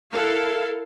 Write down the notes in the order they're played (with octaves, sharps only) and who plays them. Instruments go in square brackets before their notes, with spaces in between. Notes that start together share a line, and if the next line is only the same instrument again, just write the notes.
[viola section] E4 A4 F5 [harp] A#4 F#5